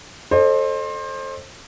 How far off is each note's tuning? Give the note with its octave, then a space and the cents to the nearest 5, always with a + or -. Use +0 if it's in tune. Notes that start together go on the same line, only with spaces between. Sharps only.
A4 +0 C5 +25 D#5 -45